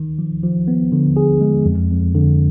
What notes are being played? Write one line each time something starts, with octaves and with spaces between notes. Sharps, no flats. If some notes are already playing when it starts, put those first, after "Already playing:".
Already playing: D#3
F3
F3
B3
D3
G#4
G#3
F2
F2
D3